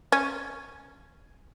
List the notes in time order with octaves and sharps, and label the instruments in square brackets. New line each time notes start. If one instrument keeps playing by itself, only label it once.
[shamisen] C#4